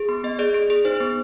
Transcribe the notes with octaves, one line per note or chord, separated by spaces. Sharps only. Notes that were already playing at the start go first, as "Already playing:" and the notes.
Already playing: G#4
B3 C6
B3 D#5
G#4 D5
G#4
G#4
D#4 C5
B3